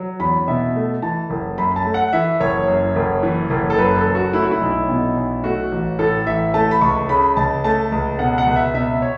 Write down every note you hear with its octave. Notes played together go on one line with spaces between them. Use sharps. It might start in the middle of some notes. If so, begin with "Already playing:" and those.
Already playing: F#3
E2 B5
B2 E5
A3
E3 A5
F#1
F#2 B5
B5
A5
A3
F#5
E3 E5
F#1 C#5
F#2
F#1
E3
F#1
A4
F#2 B4
A4
F#1
F#4
A3 E4
F#4
E4
B1
B2
B1
A3 F#4
A1
A2 A4
A1 E5
A3 A5
B5
C#2 C#6
C#3 B5
C#2 A5
A3 A5
C#2
B2 F#5
F#5
C#2
E5
B2 E5
C#5